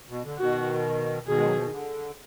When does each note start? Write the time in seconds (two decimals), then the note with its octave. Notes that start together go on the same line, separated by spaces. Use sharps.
0.09 B2
0.24 D3
0.39 B2 D#3 F#4
1.27 B2 D#3 G#4
1.37 G#3
1.46 F#3
1.55 F3
1.63 D#3
1.71 D3